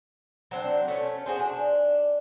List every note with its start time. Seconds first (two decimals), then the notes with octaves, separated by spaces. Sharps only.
0.51 F#3 C4 D4
0.88 A3 C#4
1.26 F#4 G#4 C5
1.40 D4